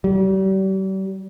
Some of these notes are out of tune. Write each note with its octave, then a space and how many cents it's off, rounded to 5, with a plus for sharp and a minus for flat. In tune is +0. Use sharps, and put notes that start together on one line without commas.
G3 -40